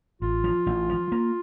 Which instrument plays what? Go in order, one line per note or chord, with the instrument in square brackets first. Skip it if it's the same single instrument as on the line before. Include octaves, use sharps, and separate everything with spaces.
[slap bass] A1 [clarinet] F4
[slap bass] F3
A1
F3
A#3